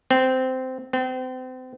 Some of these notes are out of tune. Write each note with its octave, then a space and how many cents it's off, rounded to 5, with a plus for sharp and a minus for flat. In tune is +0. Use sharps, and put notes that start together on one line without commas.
C4 -15
C4 -35